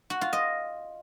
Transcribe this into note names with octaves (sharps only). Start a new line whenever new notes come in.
F#4
F4
D#5